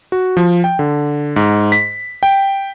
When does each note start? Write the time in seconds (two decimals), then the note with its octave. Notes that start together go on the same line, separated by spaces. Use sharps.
0.12 F#4
0.37 F3
0.64 G5
0.79 D3
1.36 G#2
1.72 B6
2.23 G5